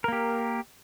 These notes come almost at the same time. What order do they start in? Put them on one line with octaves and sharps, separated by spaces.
A#4 A#3 G4